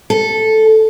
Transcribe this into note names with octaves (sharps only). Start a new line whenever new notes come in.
A4